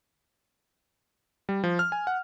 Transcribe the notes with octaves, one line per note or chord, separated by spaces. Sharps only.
G3
F3
F6
G#5
F#5